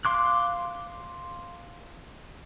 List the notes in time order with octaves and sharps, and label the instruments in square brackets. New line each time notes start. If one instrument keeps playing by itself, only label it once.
[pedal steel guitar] F5 C6 D6 F#6